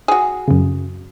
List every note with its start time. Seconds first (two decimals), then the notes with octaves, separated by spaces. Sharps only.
0.08 F#4 G#4
0.48 F#2 C#3